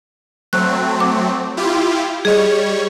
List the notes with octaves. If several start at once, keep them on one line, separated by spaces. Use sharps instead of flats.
F#3 A3 C4 F#6
D6
E4 F4 G4
G3 G#4 C#5 D#5